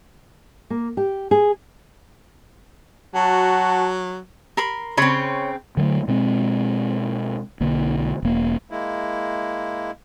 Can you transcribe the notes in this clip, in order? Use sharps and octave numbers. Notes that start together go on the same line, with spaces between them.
A#3
G4
G#4
F#3 F#4 A5
A#4 B5 C6
C#3 C4 C#5 B5 C6
D3 F#3 G#3 A3
B2 G#3 C4
B1 D3 A#3
E1 A#3
G#3 A#3 E4